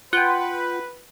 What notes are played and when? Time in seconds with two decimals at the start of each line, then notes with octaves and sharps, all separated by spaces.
0.13 F4 B4 F#5 G5